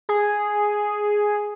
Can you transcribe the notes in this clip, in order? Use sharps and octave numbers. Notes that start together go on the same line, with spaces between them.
G#4